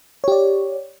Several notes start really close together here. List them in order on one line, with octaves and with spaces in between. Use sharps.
C#5 G4 D5